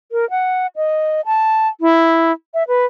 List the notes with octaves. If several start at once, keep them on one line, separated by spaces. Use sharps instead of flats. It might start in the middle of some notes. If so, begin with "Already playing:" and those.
A#4
F#5
D#5
A5
E4
E5
B4